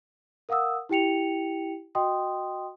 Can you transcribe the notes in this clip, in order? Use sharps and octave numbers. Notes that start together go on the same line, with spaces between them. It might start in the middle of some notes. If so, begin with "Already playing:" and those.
A#4 F5 F#5 D#6 E6
E4 G4 G5 C#7 F7
F#4 D#5 G5 C6 D#6